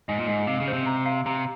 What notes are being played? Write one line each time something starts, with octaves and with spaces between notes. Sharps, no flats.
G#2 D#5
A#2
G#2 D#5
C3 F5
C#3
C5
C3
A#5
F5
C3 A#5